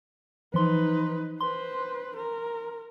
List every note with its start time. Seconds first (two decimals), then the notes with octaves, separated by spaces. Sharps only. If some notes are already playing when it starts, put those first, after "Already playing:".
0.54 E3 F3 D#4 B4 C6
1.41 B4 C5 C6
2.16 A#4